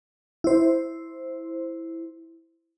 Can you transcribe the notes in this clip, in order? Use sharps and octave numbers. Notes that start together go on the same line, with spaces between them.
E4 C5